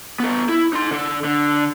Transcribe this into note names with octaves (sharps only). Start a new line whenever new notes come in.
B3 A4
E4
D#4 C6
D3 A4
D3